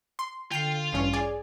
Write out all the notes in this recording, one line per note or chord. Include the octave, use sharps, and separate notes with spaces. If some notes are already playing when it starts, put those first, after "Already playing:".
C6
D3 F4 F5 G5 G6
A1 G2 C#4
G#4 D5 G#5